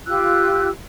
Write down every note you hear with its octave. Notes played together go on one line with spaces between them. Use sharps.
F4 G4 E6 F#6